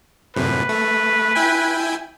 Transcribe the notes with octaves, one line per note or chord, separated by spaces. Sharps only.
F#2 A2 C3 B4
A3
E4 G5 G#5